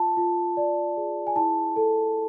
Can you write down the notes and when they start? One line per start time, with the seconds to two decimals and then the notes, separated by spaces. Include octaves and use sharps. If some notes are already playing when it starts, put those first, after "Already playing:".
Already playing: F4 A5
0.17 F4
0.57 D5
0.97 G#4
1.27 G#5
1.36 E4 A5
1.76 A4